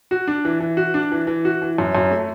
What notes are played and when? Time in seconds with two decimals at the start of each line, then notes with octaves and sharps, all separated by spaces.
0.11 F#4
0.28 D4
0.45 E3
0.60 E3
0.77 F#4
0.94 D4
1.12 E3
1.27 E3
1.45 F#4
1.62 E3
1.78 F#2
1.95 F#2
2.11 A3